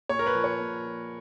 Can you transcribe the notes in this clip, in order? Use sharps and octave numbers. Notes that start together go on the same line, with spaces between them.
A#2 C#5
A#4
B4
F3
C#5
A#2
F3